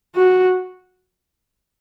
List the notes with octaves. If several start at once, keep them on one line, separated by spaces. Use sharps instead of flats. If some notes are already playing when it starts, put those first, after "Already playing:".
F#4